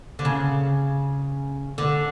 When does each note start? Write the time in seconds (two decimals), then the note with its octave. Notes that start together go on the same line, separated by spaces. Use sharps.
0.19 D3
0.25 C#3
1.78 D3